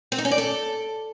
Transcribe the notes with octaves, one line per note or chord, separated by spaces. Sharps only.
C4
D#4
C#4
D5
A4